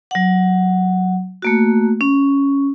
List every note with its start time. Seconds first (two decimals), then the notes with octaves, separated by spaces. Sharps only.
0.11 F#3 F#5
1.42 A3 A#3 F#4
2.01 C#4